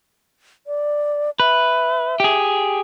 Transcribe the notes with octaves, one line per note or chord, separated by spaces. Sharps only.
D5
B4 E5
G4 G#4